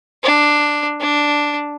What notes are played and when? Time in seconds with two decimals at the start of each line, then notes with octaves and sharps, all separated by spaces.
0.23 D4
1.01 D4